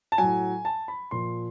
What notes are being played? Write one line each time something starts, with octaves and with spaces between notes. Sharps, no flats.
A5
A2 F#3 G#5
A5
B5
A#2 F3 C6